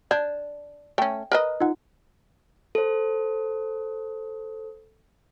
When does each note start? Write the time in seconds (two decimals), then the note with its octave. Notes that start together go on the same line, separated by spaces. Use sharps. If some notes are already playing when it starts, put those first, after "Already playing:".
0.11 D4 G6 G#6
0.98 A3 C#4 G5
1.32 A#4 B4 D#5
1.60 D#4 F4 F#5
2.75 A4 C5